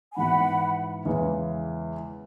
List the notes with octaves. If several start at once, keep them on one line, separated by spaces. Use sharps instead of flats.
G#5
G#2 E3 B3 F#4 F#5 B5
E2 C#3 E3 G#3